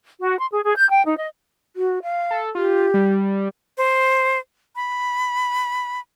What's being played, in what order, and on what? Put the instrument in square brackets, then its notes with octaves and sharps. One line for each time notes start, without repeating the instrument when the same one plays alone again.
[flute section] F#4
C6
G#4
G#4
G6
G5
D#4
D#5
[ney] F#4
F5
[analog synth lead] A4
[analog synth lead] F4 [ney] G4
[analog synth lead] G3
[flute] C5
B5